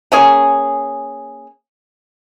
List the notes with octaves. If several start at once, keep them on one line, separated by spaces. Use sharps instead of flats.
A#3 C#4 G#4